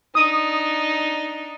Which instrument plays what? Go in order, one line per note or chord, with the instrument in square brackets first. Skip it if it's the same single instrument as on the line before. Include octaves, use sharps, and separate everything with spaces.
[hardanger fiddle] D4 D#4 [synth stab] D#6